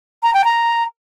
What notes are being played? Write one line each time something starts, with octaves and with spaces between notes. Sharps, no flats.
A#5
G5
A#5